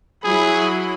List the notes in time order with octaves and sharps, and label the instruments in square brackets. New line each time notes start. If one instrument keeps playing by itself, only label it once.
[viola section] F#3 E4 B5 [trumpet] G#4